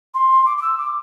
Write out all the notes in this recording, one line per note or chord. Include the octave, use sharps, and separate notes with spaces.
C6
D6
D6
E6
D6